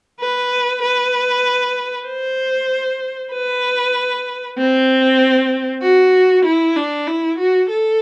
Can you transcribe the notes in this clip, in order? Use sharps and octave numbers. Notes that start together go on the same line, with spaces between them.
B4
B4
C5
B4
C4
F#4
E4
D4
E4
F#4
A4